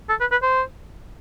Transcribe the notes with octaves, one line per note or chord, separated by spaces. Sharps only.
A4
B4
B4
C5